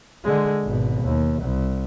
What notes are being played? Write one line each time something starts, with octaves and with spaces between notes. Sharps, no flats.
D3 G#3
G#1 B2
D#2
C2